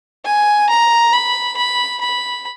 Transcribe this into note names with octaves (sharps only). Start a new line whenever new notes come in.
G#5
A#5
B5
B5
B5